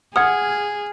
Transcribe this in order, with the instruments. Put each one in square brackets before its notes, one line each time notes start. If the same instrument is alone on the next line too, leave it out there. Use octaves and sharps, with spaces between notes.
[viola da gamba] G#4 [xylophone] F#5 D#6 [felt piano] F6 G#6